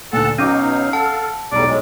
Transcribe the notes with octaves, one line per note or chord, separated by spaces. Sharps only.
D2 A#2 A4 F#5 A5
B2 F#3 C#4 D#4 F5 G5 C#6 D6
A4 F#5 A5
B1 E2 A2 G3 D5 A#5
A2 F#3 G#3